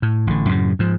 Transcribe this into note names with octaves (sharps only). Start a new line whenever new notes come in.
A2
A1 D3
F#2 A2 C#3
G#2 F3